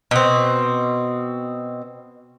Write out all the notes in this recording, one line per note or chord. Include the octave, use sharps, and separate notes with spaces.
B2 C4